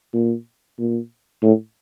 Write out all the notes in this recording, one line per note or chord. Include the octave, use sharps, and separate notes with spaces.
A#2
A#2
A2